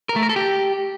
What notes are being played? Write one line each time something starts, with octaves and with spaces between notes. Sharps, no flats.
A#4
A3
A#4
A4
G4